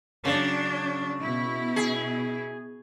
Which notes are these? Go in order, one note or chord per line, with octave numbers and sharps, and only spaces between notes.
C#3 F#3 D4
B2 E4
G#4